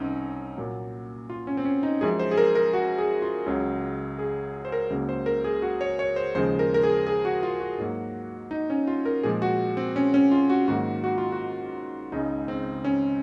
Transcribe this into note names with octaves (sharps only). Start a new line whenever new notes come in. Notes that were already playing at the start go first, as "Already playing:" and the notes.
Already playing: C2 C4 C#4 D#4
A#2 F#3 A#3
F4
C#4
C4
C#4
D#4
F#2 F3 G#3 G#4
C5
G#4
A#4
A#4
F#4
G#4
F4
C#2 C#3 F#3
G#4
C5
A#4
C#2 C#3 F#3 A#3
C5
A#4
G#4
F#4
C#5
C#5
C5
D#2 C#3 F3 G#3 C5
A#4
A#4
G#4
G#4
F#4
F4
F#4
G#2 F#3 A#3
D#4
C#4
F4
A#4
A#2 F3 G#3 G#4
F#4
C4
C#4
C#4
F4
F#4
G#2 D#3 F#3 A#3 F#4
F#4
F4
F#4
C#2 C#3 G#3 D#4
C4
C#4